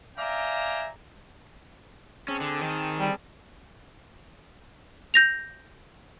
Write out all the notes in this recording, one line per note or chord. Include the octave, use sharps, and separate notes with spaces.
D5 E5 F5 G5 G#5 A#5
C4 C#4 G#4 A5
D3
D#3
G3
G6 A#6 F7